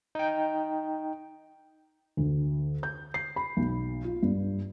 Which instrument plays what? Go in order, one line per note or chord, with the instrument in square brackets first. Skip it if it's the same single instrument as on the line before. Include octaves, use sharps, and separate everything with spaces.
[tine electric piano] D#4 G5
[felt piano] D2
G6
C7
B5
B1
F4
G2